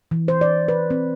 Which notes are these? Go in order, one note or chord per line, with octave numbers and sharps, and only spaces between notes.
E3
C5
D5
B4
C4